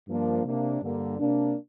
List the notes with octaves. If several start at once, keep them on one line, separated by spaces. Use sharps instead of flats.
G2 F3 A#3 D4
C3 A#3 D4
G2 D3 G3 A#3
C3 A#3 D4